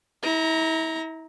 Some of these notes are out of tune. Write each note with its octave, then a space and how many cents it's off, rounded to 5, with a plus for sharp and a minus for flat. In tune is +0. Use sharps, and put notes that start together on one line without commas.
E4 -35 A#5 +0